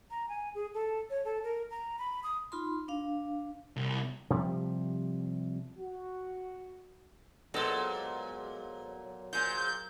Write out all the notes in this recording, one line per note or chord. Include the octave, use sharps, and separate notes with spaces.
A#5
G#5
G#4
A4
C#5
A4
A#4
A#5
B5
D#6
D#4 F4 B5 C6
D4 F5
C2
C3 F3 G3
F#4
A#2 F#3 G#3 B3 A4 C5
A#2 G#4 C5 G6